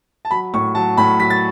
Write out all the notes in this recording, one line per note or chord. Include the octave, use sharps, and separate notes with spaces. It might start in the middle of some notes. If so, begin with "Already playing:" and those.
A5
F#3 B5
A2 C#6
F#3 A5
A2 B5
F#3 B6
A6